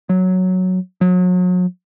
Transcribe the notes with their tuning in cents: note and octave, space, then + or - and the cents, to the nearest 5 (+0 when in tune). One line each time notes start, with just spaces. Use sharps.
F#3 +0
F#3 -35